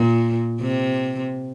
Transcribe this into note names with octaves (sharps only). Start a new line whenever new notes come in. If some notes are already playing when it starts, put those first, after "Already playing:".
Already playing: A#2
C3